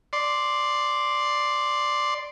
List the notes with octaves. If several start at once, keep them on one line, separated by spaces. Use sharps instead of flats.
D5 C6